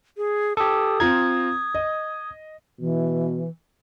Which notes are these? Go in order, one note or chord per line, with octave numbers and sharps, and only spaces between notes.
G#4
G4 A4 D#6
C4 F4 A#5 G#6
D#5
B2 E3